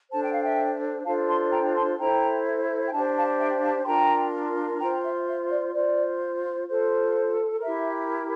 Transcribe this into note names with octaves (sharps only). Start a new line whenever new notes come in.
D4 A4 C5 A5
G5
F5
E5 G5
D4 F4 A4 C5 F5 A5
A5 C6
G5 A#5
A5 C6
E4 A4 C5 G5 A#5
G5
D4 G4 C5 F5 A5
F5 A5
E5 G5
F5 A5
C6
D4 F4 A#4 G5 A#5
F4 C5 G5 A#5
E5
E5
D5
F4 C5 D5
F4 A4 C5
E4 G4 A#4 E5